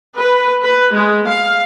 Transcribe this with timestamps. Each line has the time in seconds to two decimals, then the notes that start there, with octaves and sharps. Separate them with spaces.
0.18 B4
0.63 B4
0.95 G#3
1.29 F5